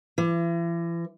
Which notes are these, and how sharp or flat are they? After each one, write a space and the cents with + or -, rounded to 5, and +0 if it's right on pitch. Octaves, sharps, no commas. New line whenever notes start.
E3 +40